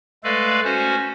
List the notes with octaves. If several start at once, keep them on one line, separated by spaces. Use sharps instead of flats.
G#3 A3 A4 B4 D5 F5
C#4 F#4 C5